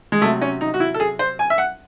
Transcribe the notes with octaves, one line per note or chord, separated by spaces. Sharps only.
G#3
C3 F#3 A3
C#4
D#4
F#4
E4
A4
G#4
C5
G#5
E5
F#5